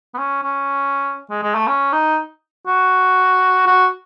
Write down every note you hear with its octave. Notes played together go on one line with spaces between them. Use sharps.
B3
C#4
C#4
G#3
G#3
A3
C#4
D#4
F#4
F#4